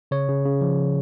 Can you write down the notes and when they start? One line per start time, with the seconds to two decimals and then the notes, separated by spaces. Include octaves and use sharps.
0.11 C#3 C#5
0.29 C#3
0.45 C#3
0.61 F3